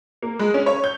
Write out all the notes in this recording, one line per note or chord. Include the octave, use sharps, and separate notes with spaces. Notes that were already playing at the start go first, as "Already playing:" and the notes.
A#3
G#3
C#4
C#5
G6